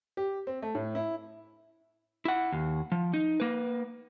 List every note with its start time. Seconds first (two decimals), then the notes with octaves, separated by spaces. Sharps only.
0.17 G4
0.47 C4
0.62 A3
0.75 A2
0.95 E4
2.25 E4 F#5
2.52 D#2
2.92 F3
3.14 D#4
3.40 A#3 B4